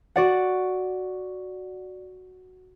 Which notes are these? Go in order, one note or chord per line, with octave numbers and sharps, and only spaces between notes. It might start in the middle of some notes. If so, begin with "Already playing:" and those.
F#4 D5 F#5